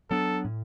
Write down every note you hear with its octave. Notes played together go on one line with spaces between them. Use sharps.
F#3 B3 D4 A4
A2